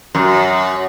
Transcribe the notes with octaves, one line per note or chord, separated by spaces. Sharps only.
F#2